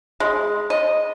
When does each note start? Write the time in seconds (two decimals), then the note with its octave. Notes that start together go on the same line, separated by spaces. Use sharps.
0.20 G#3
0.70 D#5